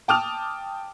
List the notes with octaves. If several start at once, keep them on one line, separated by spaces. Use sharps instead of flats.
G5 A5 D6 D#6 F6 F7